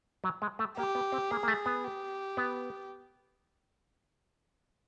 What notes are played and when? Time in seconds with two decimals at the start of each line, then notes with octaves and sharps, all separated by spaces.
0.24 F#3
0.42 G#3
0.59 A3
0.77 A#3 G4
0.95 B3
1.12 C4
1.31 A#3 G#4
1.43 A#3
1.48 A3
1.66 B3
1.84 G4
2.37 B3